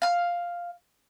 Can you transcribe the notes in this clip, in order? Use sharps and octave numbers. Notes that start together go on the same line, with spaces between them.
F5 F6